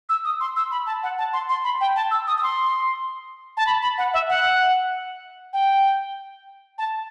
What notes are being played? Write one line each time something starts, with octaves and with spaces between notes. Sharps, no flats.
E6
D#6
C6
E6
B5
A5
F#5
A5
C6
C6
B5
G5
A5
E6
D#6
D#6
C6
A5
B5
B5
F#5
E5
F#5
G5
A5